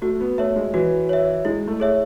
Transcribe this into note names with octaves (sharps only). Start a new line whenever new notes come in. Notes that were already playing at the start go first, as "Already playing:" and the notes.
A3 F#4
B3
A3 C#5 E5
G#3
E3 F#4
C#5 E5
G#3 E4
A3
G#4 C#5 E5